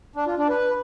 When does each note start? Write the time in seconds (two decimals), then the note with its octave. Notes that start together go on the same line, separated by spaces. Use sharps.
0.16 D4
0.27 F4
0.38 D4
0.49 B4